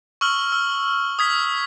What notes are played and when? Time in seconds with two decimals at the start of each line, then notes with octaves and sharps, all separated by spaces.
0.21 C#6 E6 F6 F#7
0.52 E6
1.19 D#6 G#6 B6